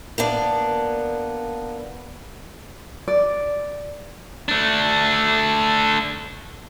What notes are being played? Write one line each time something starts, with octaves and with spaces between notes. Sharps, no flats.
A#3 B3 D4
D5
A3 D4